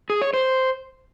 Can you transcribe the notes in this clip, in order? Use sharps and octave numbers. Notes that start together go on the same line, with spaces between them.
G#4
C#5
C5